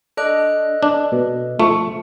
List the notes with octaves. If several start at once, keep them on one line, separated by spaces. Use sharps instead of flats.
D4 A4 D#5 F#6
D4
B2
F3 A3 C#6